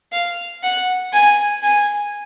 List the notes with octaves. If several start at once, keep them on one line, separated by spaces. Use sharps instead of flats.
F5
F#5
G#5
G#5